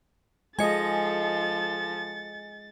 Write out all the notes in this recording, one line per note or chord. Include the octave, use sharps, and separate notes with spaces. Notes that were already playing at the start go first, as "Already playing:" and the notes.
F3 G#3 A4 D#5 G#5 A6 C#7